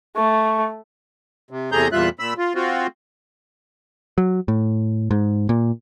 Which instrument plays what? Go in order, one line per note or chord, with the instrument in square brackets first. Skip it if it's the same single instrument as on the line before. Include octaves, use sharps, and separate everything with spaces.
[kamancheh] A3 [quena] C#6
[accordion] C3
E2 C3 A3 G#4 A#5 G6
E2 A#2 G3 F4 E5 F#6
A#2 B5 E6
F4
C4 F4 F#4
[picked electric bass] F#3
A2
G#2
A#2